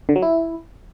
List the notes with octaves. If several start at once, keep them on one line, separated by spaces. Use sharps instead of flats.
D3
F#3
E4